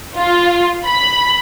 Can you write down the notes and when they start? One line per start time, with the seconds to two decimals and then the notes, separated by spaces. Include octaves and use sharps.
0.17 F4
0.86 B5